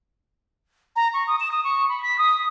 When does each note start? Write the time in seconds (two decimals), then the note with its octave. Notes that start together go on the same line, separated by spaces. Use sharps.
0.96 A#5
1.14 C#6
1.27 D#6
1.40 E7
1.51 D#6
1.64 C#6
1.89 B5
2.03 B6
2.18 D#6